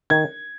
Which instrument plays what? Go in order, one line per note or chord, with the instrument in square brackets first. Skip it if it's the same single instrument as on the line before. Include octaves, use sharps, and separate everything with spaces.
[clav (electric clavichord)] D#3 [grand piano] G#6